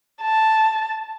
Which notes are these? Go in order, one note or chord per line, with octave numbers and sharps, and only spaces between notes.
A5